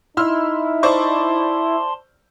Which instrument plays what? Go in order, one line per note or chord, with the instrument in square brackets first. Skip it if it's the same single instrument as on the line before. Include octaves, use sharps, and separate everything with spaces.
[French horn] D#4 [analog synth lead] E4 [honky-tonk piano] C6 E6 F6
[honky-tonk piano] C5 D5 C#6 [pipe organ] A5 C6